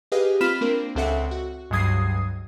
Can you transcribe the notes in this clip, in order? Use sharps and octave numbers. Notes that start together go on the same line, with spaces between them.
G4 G#4 B4 D#5 F5
C4 F4 B5 F6 B6 E7
A#3 C4 D4 A#4
C#2 C4 A4 E5 F#5
F#4
C#2 G2 F#3 D#6 G#6 C7